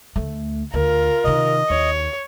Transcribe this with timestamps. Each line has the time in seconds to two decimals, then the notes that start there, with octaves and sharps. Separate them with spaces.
0.16 D2 A3
0.74 D2 F4 A#4
1.24 C3 D#3 D#5
1.70 D#2 C#5